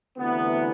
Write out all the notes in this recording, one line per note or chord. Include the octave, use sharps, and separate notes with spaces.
D2 C3 E3 B3